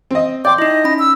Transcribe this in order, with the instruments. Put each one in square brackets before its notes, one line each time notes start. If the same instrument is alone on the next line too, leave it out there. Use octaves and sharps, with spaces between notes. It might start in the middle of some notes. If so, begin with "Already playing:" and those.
[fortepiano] C4 D#5
[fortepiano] D5 G5 C6 [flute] D6 [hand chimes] G6
[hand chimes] D#4 E4 [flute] D#5
[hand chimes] C#4 B5
[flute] E6